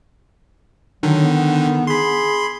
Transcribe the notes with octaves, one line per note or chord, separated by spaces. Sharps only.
D3 D#3 F#3
B3
G#4 B5 C6